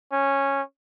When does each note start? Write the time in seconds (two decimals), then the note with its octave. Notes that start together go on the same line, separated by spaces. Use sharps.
0.12 C#4